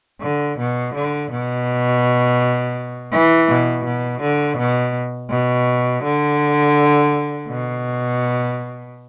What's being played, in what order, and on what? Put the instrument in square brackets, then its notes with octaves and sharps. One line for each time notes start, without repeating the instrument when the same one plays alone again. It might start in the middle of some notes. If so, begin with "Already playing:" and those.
[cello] D3
B2
D3
B2
E3
B2
B2
D3
B2
B2
D3
B2